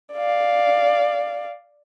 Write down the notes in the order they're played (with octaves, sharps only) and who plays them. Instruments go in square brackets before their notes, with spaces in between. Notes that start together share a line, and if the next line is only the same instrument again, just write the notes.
[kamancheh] D5 F5